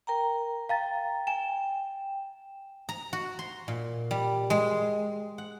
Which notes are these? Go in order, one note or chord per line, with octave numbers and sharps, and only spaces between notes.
A#4 G5 A#5
F5 G5 A#5 A6
G5 G#5 E7
A#5
F#4
C6
A#2
G3
G#3
F#5